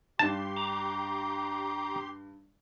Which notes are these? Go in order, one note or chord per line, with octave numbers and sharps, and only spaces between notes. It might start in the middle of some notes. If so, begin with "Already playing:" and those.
G2 D4 G4 A5 C6
A#5 D6